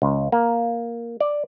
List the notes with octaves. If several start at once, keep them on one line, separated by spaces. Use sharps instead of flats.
C#2
A#3
D5